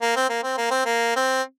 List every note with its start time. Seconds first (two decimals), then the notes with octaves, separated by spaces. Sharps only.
0.02 A#3
0.16 C4
0.29 A#3
0.44 C4
0.58 A#3
0.71 C4
0.85 A#3
1.16 C4